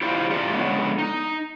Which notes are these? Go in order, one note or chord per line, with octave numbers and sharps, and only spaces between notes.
E4 F4 G4 C5 D5 F5
G3 A3 C#4 F4 G4 D5
D3 G#3 B3 C#4
D#4